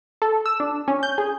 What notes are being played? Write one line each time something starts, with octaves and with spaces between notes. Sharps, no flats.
A4
E6
D4
C#4
G6
G#4